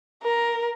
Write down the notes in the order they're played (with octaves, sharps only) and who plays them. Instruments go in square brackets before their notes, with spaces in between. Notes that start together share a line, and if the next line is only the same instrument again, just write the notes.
[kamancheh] A#4